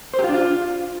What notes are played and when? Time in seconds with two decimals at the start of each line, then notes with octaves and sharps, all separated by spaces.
0.14 C5
0.19 G4
0.24 F4
0.29 D4
0.34 F4